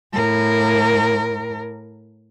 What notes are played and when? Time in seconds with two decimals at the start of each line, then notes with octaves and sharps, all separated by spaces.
0.13 A2 A#4